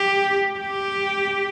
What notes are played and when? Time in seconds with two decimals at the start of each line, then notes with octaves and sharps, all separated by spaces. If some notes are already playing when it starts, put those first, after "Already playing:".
Already playing: G4
0.60 G4